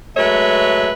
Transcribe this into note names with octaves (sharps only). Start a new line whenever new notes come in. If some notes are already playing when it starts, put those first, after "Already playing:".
F#3 G#3 A3 B4 C#5 E5